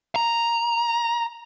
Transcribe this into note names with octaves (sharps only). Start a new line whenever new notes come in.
A#5